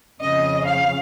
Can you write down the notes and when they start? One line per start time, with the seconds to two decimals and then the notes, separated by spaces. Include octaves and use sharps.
0.21 F2 C#3 F3 D#5
0.66 F5